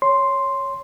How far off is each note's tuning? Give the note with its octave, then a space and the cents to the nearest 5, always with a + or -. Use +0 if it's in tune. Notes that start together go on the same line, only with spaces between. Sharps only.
C#5 +0 C6 +0